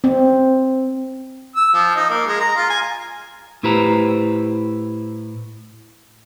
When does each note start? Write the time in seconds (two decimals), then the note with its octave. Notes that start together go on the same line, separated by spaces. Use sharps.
0.04 C4
1.56 E6
1.74 F3
1.96 D#4
2.10 A#3
2.27 G#3
2.40 A#5
2.56 F4
2.70 G#5
3.63 A2 E4 G4 B4 C5 A#5